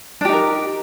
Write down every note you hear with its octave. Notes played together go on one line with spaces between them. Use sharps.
D4 D#4 G4 A#4